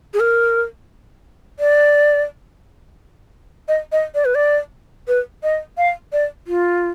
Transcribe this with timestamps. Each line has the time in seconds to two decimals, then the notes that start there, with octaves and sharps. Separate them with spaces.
0.14 G#4
0.20 A#4
1.60 D5
3.68 D#5
3.92 D#5
4.15 D5
4.25 B4
4.35 D5
5.08 B4
5.43 D#5
5.78 F5
6.13 D5
6.47 F4